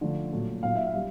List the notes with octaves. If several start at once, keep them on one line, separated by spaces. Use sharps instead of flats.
D3 F3 A3
A#2 F#3 A3
A#2 F#3 A3 F5
E5
F5
G3